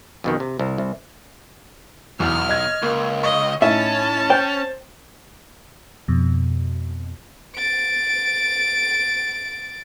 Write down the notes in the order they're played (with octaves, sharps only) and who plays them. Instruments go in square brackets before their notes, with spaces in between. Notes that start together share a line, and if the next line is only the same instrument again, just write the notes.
[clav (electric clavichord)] F2 B2 D#3
C3
C2
C2
[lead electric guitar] B1 [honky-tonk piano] E2 [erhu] F6
[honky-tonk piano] D#5 G#6
[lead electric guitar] C#2 [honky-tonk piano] A#3
[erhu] D#5 [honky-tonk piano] C#6
[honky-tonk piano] A2 D#4 [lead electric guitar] C#4 [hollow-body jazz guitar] E5 [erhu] A5
[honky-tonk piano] C5 [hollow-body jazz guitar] G5
[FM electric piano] F2 B2
[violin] A6 D7